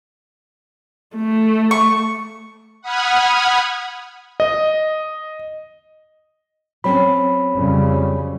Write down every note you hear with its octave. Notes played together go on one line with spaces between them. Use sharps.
A3
C#6
F#5 B5 D#6 F6 G#6
D#5
F#3 C4 C#4 C#5 B5
F2 C#3 G3